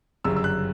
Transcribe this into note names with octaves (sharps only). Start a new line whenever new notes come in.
G1 F#2 C#3 G3 E6
E6
F#6